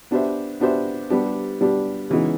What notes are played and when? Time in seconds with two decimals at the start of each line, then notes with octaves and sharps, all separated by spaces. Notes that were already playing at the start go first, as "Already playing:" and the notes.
0.11 B3 D4 G4 C5 E5
0.60 B3 D4 G4 C5 E5
1.10 G3 B3 D4 G4
1.60 G3 B3 D4 G4
2.10 C#3 E3 G#3 B3 D#4